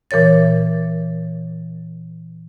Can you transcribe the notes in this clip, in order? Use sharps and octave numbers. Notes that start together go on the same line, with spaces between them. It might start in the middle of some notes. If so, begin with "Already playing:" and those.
A#2 E3 A#4 C#5 A6